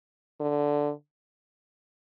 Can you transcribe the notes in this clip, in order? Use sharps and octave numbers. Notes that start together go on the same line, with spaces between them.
D3